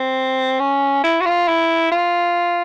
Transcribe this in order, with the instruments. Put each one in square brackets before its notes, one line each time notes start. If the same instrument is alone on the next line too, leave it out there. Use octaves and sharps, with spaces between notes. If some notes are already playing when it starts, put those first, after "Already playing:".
Already playing: [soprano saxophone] C4
C#4
E4
F#4
F4
E4
F4